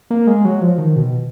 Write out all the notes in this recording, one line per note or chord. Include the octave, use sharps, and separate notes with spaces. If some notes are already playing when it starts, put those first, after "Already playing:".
A#3
G#3
F#3
F3
D#3
B2